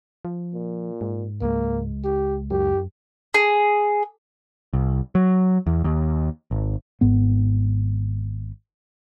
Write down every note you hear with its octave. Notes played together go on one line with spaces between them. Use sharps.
F3
A#2
G#2
C#2 G#3 A#3
G4
F#2 G4
G#4
C2
F#3
E2
D#2
G#1
G#1 G#2 B3